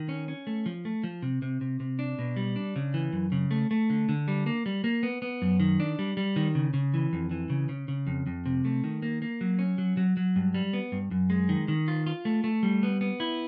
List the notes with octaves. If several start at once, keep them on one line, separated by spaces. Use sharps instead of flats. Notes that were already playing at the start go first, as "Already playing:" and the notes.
Already playing: D#3
C#4
C#4
A3
F3
A3
F3
C3
C3
C3
C3
D4
B2
G3
D4
C#3
E3
F#2
C#3
A3
A3
D3
D3
G3
A#3
G3
A#3
B3
B3
F#2
D#3
D4
G3
G3
D#3
C#3
C#3
E3
F2
E3
C#3
C#3
C#3
F2
F2
C3
A3
D#3
A#3
A#3
F#3
C#4
F#3
F#3
F#3
G2
G3
B3
G2
F#2
G#3
D#3
D#3
F4
F4
A3
A3
G3
B3
B3
E4